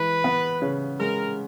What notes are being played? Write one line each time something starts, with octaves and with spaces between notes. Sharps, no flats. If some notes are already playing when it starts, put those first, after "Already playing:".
Already playing: E3 G#3 B4
B3
C#3
G#3 A#4